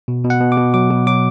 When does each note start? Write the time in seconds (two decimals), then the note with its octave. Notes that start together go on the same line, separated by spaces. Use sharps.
0.08 B2
0.24 B2
0.30 F#5
0.41 B2
0.52 D6
0.57 B2
0.74 F#3 D6
0.91 B2
1.07 F#3 D6